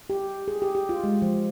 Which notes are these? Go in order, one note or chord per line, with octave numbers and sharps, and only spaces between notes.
G4
G#4
G4
G4
F4
G#3
F3